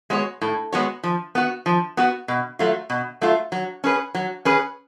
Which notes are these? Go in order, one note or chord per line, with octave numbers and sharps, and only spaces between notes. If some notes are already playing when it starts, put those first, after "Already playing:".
G#3 B3 F#4 C#5
A2
G#3 B3 F#4 C#5
F3
B3 F#4
F3
B3 F#4
B2
F#3 A3 F4
B2
F#3 A3 F4
F#3
C#4 G#4 B4
F#3
C#4 G#4 B4